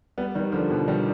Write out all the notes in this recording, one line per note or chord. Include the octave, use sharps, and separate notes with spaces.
G3 B3
D#3 G3
D3 F3
B2
D#3 G3